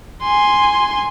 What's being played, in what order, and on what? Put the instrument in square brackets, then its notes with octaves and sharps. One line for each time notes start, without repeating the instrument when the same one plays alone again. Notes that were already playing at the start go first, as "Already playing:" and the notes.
[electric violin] G#5 C6